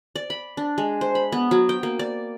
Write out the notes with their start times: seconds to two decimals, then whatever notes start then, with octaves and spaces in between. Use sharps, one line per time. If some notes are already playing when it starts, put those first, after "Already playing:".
0.15 D5
0.30 B5
0.57 D4
0.78 G#3
1.01 C5
1.15 B5
1.32 B3
1.51 F#3
1.69 G5
1.83 A#3
1.99 D5